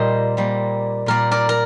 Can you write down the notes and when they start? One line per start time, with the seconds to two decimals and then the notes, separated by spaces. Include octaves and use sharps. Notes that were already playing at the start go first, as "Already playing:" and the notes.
Already playing: A#2 G3 A#3 C5 D#5
0.37 A#2 G3 A#3
1.06 A#2 G3 A#3 A#4 D5
1.31 A#4 D5
1.49 A#4